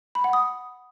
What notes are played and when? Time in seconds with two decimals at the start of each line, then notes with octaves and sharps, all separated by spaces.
0.15 B5
0.24 F#5
0.33 D#6